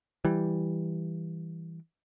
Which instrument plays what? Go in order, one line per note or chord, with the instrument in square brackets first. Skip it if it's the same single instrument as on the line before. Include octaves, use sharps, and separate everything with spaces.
[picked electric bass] E3 G3